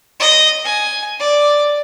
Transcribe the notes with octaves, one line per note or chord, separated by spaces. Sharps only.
D#5
G#5
D5